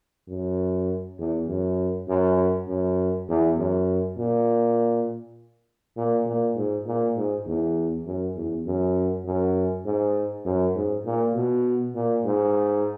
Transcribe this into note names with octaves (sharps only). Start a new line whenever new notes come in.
F#2
E2
F#2
F#2
F#2
E2
F#2
A#2
A#2
A#2
G#2
A#2
G#2
E2
F#2
E2
F#2
F#2
G#2
F#2
G#2
A#2
B2
A#2
G#2